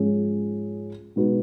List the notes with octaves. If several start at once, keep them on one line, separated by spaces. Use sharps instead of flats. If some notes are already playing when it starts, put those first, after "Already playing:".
Already playing: G#2 F3 G#3 C#4 G#4
B2 G#3 D#4 F#4 B4